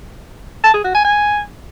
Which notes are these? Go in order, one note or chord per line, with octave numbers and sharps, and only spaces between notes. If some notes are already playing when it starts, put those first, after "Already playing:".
A5
G#4
F#4
G#5
G#5